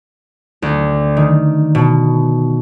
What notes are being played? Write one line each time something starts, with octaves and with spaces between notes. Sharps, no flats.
D2
D#3
B2